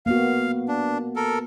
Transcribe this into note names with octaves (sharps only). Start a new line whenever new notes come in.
A#3 B3 F#4 F5
D4
A4 A#4